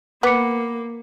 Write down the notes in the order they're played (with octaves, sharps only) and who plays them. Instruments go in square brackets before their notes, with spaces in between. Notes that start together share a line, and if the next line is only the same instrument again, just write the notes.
[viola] A#3 [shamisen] B3 [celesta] B5 D6 C#7